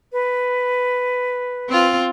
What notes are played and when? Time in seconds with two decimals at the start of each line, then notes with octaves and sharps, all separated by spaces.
0.12 B4
1.69 C4 F4